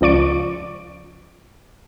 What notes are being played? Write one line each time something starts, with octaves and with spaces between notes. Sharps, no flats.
C#2 F3 D5 C#6 D7